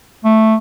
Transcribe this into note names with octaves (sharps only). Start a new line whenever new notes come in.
A3